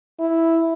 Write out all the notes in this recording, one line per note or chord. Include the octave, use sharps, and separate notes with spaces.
E4